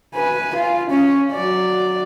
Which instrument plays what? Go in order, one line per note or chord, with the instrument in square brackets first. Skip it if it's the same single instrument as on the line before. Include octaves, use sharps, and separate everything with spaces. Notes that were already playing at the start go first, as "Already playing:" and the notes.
[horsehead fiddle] B4 G#5
F4
C#4
F#3 D5